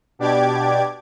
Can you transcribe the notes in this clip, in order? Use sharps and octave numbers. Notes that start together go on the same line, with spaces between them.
B2 D4 G4 D5 D6 G#6